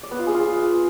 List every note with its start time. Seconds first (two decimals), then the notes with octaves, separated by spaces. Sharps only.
0.03 D5
0.11 B3
0.19 F4
0.27 G#4
0.34 F4